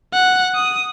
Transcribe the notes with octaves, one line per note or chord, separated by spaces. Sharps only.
F#5
D#6